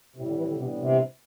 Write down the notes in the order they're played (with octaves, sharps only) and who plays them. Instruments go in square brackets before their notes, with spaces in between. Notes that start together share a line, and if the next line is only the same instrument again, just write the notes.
[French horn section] A2 G3 C4 E4 [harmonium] C3
[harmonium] D3
E3
D3
[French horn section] A2 E3 G3 B3 D4 [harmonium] C3
[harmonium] C3